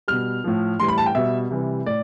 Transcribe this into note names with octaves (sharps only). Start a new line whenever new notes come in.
B2 G3 F6
A2 F3
A2 E3 G3 C6
B5
A5
G5
B2 G3 E5
C3 E3 G3
A2 D5